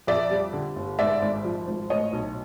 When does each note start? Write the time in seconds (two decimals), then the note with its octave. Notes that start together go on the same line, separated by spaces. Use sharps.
0.07 F2 D5 E5
0.31 G3
0.53 D3
0.76 G1
0.99 G#2 D5 E5
1.22 G#1
1.45 F3
1.67 G#1
1.90 A2 C#5 D#5
2.13 B1